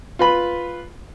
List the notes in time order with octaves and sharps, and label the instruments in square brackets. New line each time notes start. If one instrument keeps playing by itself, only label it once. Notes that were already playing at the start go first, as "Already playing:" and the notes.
[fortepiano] F4 B4 B5